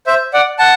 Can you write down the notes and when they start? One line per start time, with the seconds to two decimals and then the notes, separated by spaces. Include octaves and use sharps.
0.07 C5 E5
0.33 D5 F#5
0.59 F#5 A5